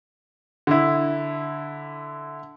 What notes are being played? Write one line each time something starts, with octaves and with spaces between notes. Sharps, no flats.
D3 E4